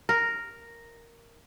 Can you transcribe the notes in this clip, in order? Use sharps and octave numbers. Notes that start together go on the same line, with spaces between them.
A#4